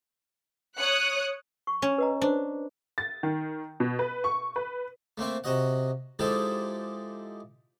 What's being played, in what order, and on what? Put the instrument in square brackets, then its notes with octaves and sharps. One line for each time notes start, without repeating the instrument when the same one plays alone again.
[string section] C#5 D#6 F#6 C#7
[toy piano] C#6
[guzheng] C#4
[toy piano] B4 D#5 A#5
[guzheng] D4 [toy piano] C5
[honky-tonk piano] A6
D#3
B2
B4
C#6
B4
[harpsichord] A3 A#3 C4 E5
C3 F#4 D#5 F#5
F3 G#3 D#4 E4 G4 A4